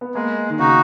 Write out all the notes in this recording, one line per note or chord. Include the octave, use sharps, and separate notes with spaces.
B3
G#3 A#3
D#3
C#3 D#4 F#4